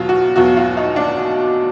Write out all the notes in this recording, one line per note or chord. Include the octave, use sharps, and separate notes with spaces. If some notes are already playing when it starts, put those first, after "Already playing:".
Already playing: E2 B2 F#3 F4
F#4
E2 B2 F#3 F#4
F4
D#4
D4